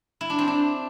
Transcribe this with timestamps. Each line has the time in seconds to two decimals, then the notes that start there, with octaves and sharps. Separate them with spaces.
0.21 E4
0.30 D4
0.39 C4
0.48 D4